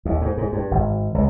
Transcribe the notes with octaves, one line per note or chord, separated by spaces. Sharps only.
D#2
G#2
G#2
G2
G#1
C#2